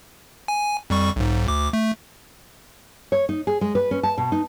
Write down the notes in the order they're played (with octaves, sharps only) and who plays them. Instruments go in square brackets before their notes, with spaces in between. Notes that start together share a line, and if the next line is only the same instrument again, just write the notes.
[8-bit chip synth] G#5
F2 G3 C#6
B1 G#2
D2 D6
A3
[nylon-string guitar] C#5
D#4
G#4
G#3
B4
C#4
A5
B2
D#4